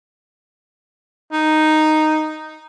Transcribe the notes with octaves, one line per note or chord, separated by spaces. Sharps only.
D#4